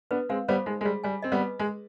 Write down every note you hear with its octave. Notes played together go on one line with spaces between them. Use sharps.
B3 D4 B4
G#3 C4 F5
G3 B3 C5
G#3 D#4
G#3
G3 G#4
G3 G#5
C4 D#5
G3 B3
B4
G#3 G#4